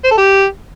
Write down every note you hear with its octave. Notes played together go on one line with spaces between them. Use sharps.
C5
A4
G4